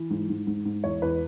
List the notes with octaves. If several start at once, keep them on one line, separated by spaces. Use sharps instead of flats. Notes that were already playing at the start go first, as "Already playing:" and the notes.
Already playing: E3
G#2
G#2
G#2
G#2
E2 C#5
E2 B4